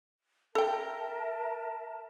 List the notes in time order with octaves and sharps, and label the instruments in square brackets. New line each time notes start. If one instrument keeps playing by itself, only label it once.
[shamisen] A4 G5 [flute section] A#4 E5 A5